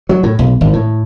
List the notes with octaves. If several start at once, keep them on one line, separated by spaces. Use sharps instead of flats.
F#3
A2
B1
G#1
A2